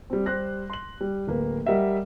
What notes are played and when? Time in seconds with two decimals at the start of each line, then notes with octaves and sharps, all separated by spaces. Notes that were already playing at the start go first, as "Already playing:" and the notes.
0.10 G3 C4
0.26 G3 G4 C5 F#6 A#6
0.70 C6 F#7
1.01 G3
1.27 D1 A#3 B4
1.66 G3 A#4 D#5 E5 F#5